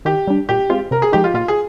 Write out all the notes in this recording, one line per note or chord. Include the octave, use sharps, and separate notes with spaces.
D#3 G4
G3 D4
A#2 G4
G#3 C4 F4
C3 A#4
G#4
F3 G#3 D#4 G4
F4
A#2 F4
G#4